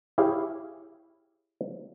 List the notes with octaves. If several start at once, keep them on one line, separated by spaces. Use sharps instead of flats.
E4 G4 G#4 C#5 F5